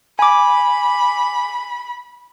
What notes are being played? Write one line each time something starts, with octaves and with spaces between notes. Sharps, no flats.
G#5 B5 D6